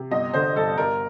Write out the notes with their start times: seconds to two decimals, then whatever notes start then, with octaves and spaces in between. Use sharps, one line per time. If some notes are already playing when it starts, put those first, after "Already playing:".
Already playing: C3
0.11 G1 D#5
0.34 D3 C5
0.56 G2 A4
0.77 G2 A#4